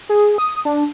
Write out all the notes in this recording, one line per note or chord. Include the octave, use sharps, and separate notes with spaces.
G#4
D#6
D4